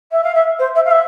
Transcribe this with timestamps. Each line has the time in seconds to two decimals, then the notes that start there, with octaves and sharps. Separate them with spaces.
0.11 E5
0.23 F5
0.34 E5
0.59 C5
0.75 E5
0.85 F5
0.90 E5